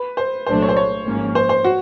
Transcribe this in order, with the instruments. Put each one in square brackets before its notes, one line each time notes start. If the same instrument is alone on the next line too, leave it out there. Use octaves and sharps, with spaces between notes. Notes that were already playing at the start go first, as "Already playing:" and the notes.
Already playing: [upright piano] B4
C5
[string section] C2 A#2 F#3 A3 D4 [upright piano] C5
[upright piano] C#5
C5
C#5
[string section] G#1 G#2 F3 A#3 C#4
[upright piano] C5
C5
F#4